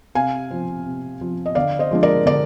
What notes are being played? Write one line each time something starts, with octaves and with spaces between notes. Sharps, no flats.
C3 F5 G#5
F3 C4
C3
F3 C4
D#5
D3 D5 F5
C5 D#5
F3 G#3 D4
A#4 D5
D3 A#4 D5